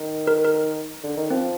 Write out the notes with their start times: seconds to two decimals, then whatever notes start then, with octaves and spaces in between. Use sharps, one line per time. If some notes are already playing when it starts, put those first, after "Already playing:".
Already playing: D#3
0.27 A#4
0.45 A#4
1.04 D3
1.17 D#3
1.30 F3 C4